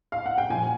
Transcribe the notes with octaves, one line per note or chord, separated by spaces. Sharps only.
F5
F#5
G5
A#2 F3 G#5